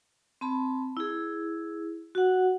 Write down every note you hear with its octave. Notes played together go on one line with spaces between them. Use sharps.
C4 A5 B5
E4 G#4
F#4 F#5